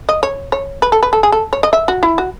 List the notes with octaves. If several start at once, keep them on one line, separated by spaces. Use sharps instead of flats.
D#5
C#5
C#5
B4
A4
B4
A4
G#4
A4
C#5
D#5
E5
F#4
E4
F#4